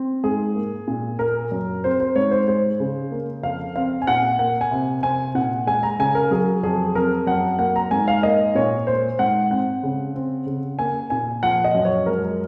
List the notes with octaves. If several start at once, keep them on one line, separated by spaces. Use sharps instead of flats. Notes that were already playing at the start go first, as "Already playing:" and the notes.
Already playing: C4
G#2 G#4
A#3
A#2
A#3 A#4
F#2
C4 C5
C5
G#2 C#5
C5
G#3 C5
C#3
A#3
F2 F5
C4 F5
G#5
A#2 F#5
A#3 F#5
G#5
C3
C4 G#5
A#2 F#5
G#3 G#5
A#5
C#3 G#5
A#4
F#3 G#4
F2 G#4
C4 A#4
F#2 F#5
A#3 F#5
A#5
G#2 G#5
F5
A#3 D#5
A#2 C#5
A#3 C5
G#2 F#5
C4 F#5
C#3
C4
C#3
A#3 G#5
A#2 G#5
F3 F#5
D#5
F#2
C#5
G#3 A#4